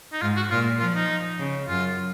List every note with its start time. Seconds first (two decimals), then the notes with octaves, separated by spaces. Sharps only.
0.13 D#4
0.22 G#2 F4
0.36 F#4
0.51 A#2 F4
0.80 F3 F4
0.95 D#4
1.39 C#3
1.68 F#2 F4